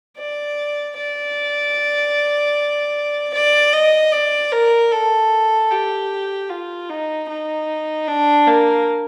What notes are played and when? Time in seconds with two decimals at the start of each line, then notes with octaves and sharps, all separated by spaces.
0.18 D5
0.97 D5
3.34 D5
3.73 D#5
4.13 D5
4.52 A#4
4.92 A4
5.70 G4
6.50 F4
6.89 D#4
7.29 D#4
8.08 D4
8.47 A#3